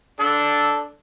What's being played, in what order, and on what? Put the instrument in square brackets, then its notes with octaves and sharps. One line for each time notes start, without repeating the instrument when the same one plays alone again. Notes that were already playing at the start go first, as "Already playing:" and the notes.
[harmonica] D4 A4